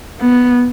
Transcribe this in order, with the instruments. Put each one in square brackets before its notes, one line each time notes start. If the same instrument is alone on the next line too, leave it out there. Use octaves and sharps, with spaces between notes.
[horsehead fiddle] B3